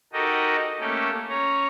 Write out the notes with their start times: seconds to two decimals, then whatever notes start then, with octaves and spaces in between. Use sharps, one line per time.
0.13 D#4 F#4 G4 A4 A#4 D#5
0.80 A3 A#3 C#4 G4 A4
1.29 C#4 C#5 A#5